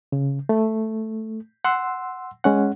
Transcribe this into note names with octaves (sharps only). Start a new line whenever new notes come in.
C#3
A3
F#5 C6 E6
G#3 C#4 F#5